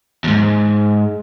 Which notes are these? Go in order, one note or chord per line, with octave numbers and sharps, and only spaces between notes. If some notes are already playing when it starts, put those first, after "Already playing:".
D#2 G#2